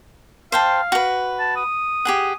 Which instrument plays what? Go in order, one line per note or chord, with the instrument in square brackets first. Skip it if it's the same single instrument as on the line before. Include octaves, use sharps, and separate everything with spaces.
[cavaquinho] C5 G5 A5 [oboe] F5
[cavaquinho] F#4 B4
[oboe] A5
D#6
[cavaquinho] G4 G#4 F#5